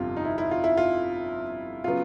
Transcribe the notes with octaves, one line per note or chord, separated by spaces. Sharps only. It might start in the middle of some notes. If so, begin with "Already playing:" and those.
Already playing: G1 F2 C3 F4
D#4
E4
E4
F4
E4
F4
C#3 F#3 B3 F4